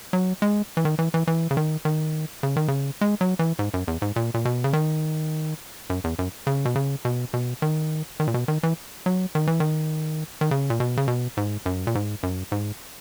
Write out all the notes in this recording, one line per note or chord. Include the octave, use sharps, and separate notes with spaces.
F#3
G#3
E3
D#3
E3
E3
E3
C#3
D#3
D#3
C#3
D#3
C#3
G#3
F#3
E3
G#2
F#2
E2
G#2
A#2
A#2
B2
C#3
D#3
F#2
E2
F#2
C#3
B2
C#3
B2
B2
D#3
D#3
A#2
B2
D#3
E3
F#3
D#3
E3
D#3
D#3
C#3
A#2
B2
C#3
B2
G#2
F#2
A#2
G#2
F#2
G#2